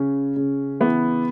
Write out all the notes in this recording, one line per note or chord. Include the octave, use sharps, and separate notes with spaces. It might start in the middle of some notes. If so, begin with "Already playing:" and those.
Already playing: C#3 C#4
C#3
E3 B3